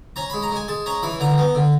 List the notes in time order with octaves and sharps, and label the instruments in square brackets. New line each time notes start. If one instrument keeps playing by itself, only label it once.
[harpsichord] C#4 A#5
G#3 B5
A#5
G#3 G#5
G#3 A5
C#4 A#5
E3 B5
D3 A#5
B3
D3